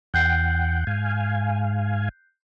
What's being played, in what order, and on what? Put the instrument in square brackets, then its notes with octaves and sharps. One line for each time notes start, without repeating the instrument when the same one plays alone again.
[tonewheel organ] E2 F#5 G5 [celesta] F#6 G6 C7
[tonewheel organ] G#2 F5 G#5